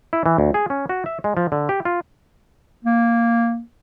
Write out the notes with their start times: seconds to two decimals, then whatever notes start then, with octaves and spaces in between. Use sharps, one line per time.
0.13 E4
0.26 E3
0.38 D2
0.54 G#4
0.70 C#4
0.89 F#4
1.06 E5
1.24 G#3
1.37 F3
1.52 D3
1.69 G4
1.85 F4
2.85 A#3